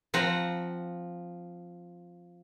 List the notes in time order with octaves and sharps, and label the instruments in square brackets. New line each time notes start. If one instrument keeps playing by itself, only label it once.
[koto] F3 C4 F#5 A#5